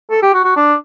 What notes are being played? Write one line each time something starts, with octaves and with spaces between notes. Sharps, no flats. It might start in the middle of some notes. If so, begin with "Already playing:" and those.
A4
G4
F#4
F#4
D4